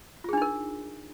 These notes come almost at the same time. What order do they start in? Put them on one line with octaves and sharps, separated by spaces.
F4 G#4 D4 D#4 A#4